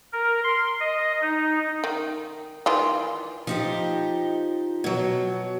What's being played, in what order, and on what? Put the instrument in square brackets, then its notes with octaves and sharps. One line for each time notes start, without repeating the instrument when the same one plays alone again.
[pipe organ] A#4
C6
D#5
D#4
[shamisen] D#3
D#3 E3 F4
[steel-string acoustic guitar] F3 D#4 G4
B2 F#3